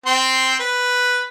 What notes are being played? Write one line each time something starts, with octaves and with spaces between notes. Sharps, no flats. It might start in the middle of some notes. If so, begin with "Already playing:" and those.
C4 G5 C6
B4